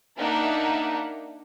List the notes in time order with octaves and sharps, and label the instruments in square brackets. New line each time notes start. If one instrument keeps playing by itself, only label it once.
[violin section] A#3 D4 D#4 A#4 E5 F#5